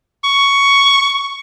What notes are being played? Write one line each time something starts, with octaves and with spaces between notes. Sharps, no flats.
C#6